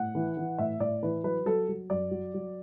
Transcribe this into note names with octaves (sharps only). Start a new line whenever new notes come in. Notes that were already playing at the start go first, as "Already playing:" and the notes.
Already playing: A2 F#5
E3
E3
A2 E5
A2 D5
E3 B4
F#3 B4
F#3 A4
F#3
F#2 D5
F#3
F#3